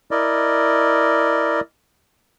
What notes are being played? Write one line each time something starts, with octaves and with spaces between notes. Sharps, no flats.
E4 A#4 D5 D#5